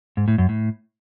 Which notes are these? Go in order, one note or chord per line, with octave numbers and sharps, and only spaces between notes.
G#2
A2
F#2
A2